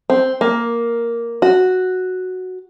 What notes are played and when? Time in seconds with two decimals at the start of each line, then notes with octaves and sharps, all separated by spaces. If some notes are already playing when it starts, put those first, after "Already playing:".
0.10 C4
0.41 A#3
1.42 F#4